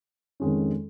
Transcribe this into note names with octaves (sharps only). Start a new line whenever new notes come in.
F2 D#3 G#3 C#4